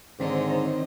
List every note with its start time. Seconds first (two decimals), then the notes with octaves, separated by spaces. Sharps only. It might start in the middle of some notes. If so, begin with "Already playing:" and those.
0.20 G#2 D3 D#3 C4 C#5 D#5